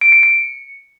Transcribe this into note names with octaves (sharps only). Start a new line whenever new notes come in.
D7
C#7
C#7